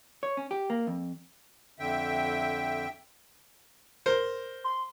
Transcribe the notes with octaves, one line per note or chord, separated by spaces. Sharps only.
C#5
C#4
G4
A#3
F2
F2 D3 E5 G5
A#4 C5
C6